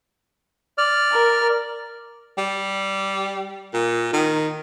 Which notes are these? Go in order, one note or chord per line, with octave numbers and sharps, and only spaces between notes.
D5 F6
A#4
G3
A#2
D#3